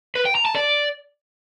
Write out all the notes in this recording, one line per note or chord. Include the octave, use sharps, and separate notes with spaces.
B4
G5
A#5
A5
D5